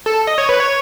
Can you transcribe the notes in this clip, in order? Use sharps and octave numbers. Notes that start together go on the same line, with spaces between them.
A4
D#5
C#5
B4
C#5